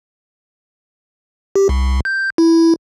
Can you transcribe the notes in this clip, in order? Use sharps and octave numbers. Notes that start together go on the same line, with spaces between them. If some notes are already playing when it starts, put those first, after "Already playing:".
G4
C2
G6
E4